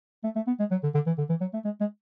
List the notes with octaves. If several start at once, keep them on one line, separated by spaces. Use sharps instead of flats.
A3
A3
B3
G#3
F#3
D3
D3
E3
D3
E3
F#3
A3
G#3
G#3